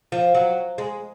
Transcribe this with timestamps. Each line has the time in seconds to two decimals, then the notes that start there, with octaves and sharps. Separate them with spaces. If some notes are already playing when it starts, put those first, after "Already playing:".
0.12 F3
0.35 F#3
0.78 G#3